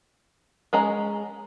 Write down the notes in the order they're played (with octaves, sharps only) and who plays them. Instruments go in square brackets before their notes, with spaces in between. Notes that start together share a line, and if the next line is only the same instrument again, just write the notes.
[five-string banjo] G#3 C#4 G#4 D#5 A#5